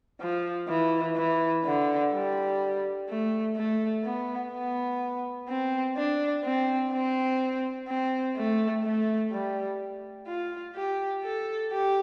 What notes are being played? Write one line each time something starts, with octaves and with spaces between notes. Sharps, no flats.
F3
E3
E3
D3
G3
A3
A3
B3
B3
C4
D4
C4
C4
C4
A3
A3
G3
F4
G4
A4
G4